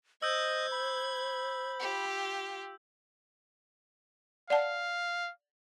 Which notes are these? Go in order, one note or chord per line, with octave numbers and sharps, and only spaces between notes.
C5 D#5 E6 G6 G#6
B5
F4 G4
D5 F5 F#5 A5